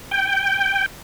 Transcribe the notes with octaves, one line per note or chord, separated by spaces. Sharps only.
G5